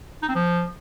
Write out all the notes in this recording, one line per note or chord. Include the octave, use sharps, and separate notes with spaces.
D#4
C4
F3